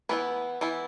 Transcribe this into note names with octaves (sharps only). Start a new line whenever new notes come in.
E3 B3 E4 B4
E3 B3 E4